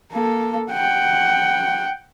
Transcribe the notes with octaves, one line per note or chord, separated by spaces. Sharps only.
A#3 A4
F#5 G5